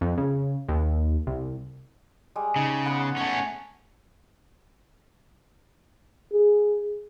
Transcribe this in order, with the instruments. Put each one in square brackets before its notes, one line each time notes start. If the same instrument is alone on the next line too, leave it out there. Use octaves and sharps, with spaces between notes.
[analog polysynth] F2
C#3
D#2
C2
[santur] G3 G#3
[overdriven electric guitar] C#3 [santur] D#4
[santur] B3 B4 F#5
[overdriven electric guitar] A3 C#4 [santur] G#5 C#6
[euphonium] G#4